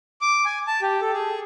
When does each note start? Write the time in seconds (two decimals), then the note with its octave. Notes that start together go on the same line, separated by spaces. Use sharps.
0.21 D6
0.45 G#5
0.67 A5
0.82 G4
1.01 A4
1.13 G#4